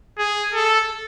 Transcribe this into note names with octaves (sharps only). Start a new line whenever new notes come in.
G#4
A4